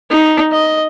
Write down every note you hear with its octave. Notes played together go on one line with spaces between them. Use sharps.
D#4
D#5